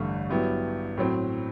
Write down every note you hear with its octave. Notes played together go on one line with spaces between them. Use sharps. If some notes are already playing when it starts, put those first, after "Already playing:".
Already playing: A1 G2 D3 A3
G2 F#3 B3 E4 G4
A2 F#3 C4